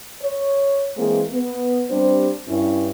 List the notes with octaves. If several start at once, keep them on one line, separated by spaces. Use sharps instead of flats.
C#5
E3 G#3 A#3 C4 E4 G#4
B3
G3 C4 D4 G4 C5
G2 C#4 E4